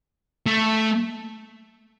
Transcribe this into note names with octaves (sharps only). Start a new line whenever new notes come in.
A3